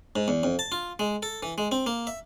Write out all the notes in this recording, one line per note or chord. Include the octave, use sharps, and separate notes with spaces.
G#2
E2
F2
A5
F4
G#3
A4
E3
G#3
C4
A#3
E5